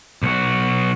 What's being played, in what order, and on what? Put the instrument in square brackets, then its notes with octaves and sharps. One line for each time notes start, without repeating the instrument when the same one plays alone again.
[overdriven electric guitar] B1 F#4